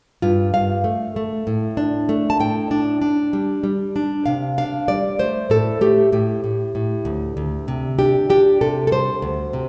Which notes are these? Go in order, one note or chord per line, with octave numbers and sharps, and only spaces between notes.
G2 F4
G2 F5
A3
A3
A2
D4
A3
A5
A2 G5
D4
D4
G3
G3
D4
C3 F5
D4 F5
G3 D5
A3 C5
A2 A4
A3 G4
A2 G4
A2
A2
D2
D2
C3
D4 G4
D4 G4
C3 A4
A4
G3 C5
D2
C3